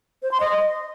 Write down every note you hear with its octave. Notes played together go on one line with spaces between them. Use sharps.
C5
C6
D#5